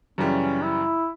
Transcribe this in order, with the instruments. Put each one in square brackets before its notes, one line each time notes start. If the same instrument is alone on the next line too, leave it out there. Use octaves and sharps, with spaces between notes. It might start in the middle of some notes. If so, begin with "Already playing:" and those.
[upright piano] F#2 C#3 E3 G3 [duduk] C#4
[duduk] E4